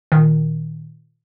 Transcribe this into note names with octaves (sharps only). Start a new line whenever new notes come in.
A#2 D#3